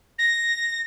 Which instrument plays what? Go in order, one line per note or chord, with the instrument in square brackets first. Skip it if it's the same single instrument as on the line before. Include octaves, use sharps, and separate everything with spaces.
[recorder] A#6